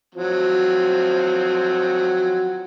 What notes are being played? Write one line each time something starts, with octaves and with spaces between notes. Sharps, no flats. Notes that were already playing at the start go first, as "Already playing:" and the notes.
F3 F#3 C4